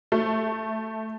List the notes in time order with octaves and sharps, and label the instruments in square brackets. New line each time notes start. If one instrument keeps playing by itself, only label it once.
[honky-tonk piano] A3